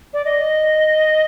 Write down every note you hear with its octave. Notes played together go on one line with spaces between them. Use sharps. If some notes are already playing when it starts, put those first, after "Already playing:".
D5
D#5